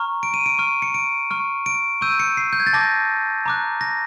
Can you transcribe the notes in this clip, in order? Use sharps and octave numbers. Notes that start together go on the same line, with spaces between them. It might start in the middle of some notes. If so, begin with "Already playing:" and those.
Already playing: A#5 C#6 F6
D7
D#7
D7
C#6 F6
C#7
D7
C#6 F6
D7
C#6 E6 G6 D#7
C#7
C7
G6
G#6
A6
A5 D6 G6 A#6
A#5 D6 F#6
A#6